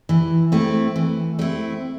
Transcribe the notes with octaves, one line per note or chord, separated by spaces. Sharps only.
E3
A3 C4 E4
E3
A3 C4 E4